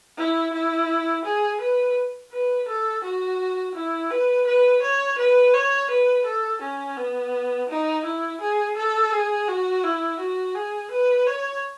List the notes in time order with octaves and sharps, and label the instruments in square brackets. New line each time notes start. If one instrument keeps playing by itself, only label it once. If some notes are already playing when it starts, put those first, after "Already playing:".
[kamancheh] E4
E4
G#4
B4
B4
A4
F#4
E4
B4
B4
C#5
B4
C#5
B4
A4
C#4
B3
D#4
E4
G#4
A4
G#4
F#4
E4
F#4
G#4
B4
C#5